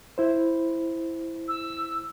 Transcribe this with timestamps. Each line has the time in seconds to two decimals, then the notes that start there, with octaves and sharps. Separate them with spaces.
0.18 E4 C5
1.48 E6